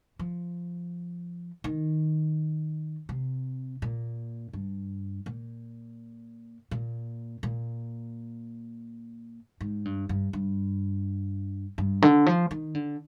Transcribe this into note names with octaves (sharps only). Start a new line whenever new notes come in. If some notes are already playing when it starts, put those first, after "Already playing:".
F3
D#3
C3
A#2
G2
A#2
A#2
A#2
G#2
G2
G2
G2
G2
D3
F3
D#3
D3